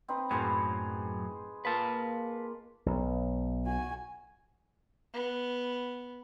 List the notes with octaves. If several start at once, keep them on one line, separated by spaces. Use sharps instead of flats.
C4 D#4 B4
F#2 A2 F#3 G#4 B4 C5
A#3 F4 B4 F5 A5
B1
F#4 G#5
B3